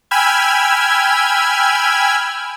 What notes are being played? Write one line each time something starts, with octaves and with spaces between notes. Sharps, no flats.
G5 G#5 B5 E6 F6 G#6